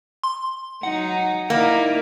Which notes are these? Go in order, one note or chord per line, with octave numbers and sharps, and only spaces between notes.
C6
F#3 D#4 F#5
A#3 D#4 E4 D5